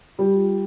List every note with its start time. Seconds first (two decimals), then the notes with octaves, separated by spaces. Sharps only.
0.18 G3 F4
0.27 G4
0.35 F4